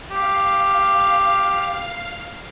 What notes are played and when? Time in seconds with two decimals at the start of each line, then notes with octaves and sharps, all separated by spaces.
0.11 G4 F5